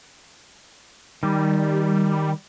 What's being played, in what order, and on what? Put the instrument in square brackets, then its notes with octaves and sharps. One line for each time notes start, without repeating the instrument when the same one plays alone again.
[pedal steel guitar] D#3 [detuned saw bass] G3